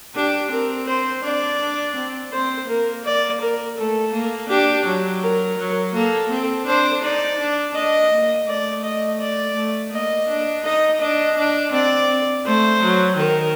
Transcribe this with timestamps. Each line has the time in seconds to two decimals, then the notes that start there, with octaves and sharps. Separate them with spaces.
0.15 D4 G4
0.51 C4 A#4
0.87 C5
1.23 D4 D5
1.60 D4
1.96 C4
2.32 C4 C5
2.68 A#3 A#4
3.05 D5
3.41 A#4
3.77 A3 A4
4.13 A#3
4.49 D4 G4
4.86 F#3
5.22 A#4
5.58 F#3
5.94 A#3 A4
6.30 C4
6.67 D4 C5
7.03 D#4 D5
7.39 D4
7.75 D4 D#5
8.11 A#3
8.47 A3 D5
8.84 D#5
9.20 D5
9.56 A3
9.92 A#3 D#5
10.29 D4
10.65 D#4 D#5
11.01 D4 D#5
11.37 D4
11.73 C4 D5
12.45 A3 C5
12.82 F#3
13.17 D#3 A#4